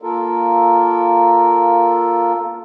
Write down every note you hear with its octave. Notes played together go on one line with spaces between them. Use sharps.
A#3 F4 A4 A#4